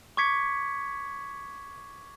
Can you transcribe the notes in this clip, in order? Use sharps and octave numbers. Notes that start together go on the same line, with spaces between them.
C#6 D6 G#6 B6 C#7